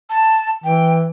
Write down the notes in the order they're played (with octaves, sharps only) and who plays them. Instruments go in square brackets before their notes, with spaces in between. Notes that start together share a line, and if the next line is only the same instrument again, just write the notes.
[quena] A5
[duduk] E3 [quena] G5